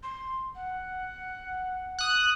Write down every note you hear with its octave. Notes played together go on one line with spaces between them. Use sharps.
C6
F#5
D#6 F#6